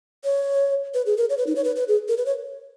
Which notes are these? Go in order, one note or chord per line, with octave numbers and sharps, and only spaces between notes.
C#5
B4
G#4
A#4
C#5
B4
D#4
C#5
B4
B4
G#4
A#4
B4
C#5